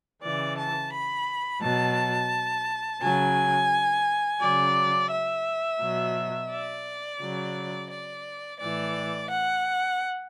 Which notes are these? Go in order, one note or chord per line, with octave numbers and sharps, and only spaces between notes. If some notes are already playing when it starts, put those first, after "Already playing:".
C#3 E3 D5
A5
B5
B2 F#3 A5
C#3 F#3 G#5
C#3 F#3 D5
E5
B2 F#3
D5
C#3 F#3
D5
A2 E3 D5
F#5